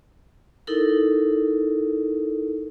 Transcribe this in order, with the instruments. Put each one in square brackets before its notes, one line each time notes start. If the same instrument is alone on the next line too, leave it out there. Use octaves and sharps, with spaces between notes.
[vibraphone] D#4 E4 A4 A#4